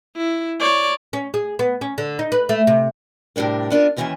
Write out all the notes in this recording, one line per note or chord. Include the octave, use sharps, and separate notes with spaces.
E4
C#5 D5
C#4
G#4
B3
C#4
D3
D#4
B4
A3
C3
A2 C3 G3 D4 A#4
B3 D4 F4 A#4
D#2 D#3 E3 G#3 C#4 E5